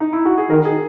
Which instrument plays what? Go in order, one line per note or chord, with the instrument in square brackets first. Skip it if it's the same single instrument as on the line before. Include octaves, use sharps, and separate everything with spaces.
[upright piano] D#4
E4
F#4
G#4
[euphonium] D#3 [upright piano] A#4
[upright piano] G#4